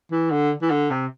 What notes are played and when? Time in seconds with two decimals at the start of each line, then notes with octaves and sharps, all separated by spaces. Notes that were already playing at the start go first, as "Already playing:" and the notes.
0.11 E3
0.31 D3
0.62 E3
0.71 D3
0.90 C3